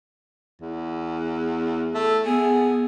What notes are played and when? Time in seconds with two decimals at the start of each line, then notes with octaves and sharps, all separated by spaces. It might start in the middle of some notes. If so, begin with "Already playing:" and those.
0.61 E2
1.94 A3
2.25 B3 G#4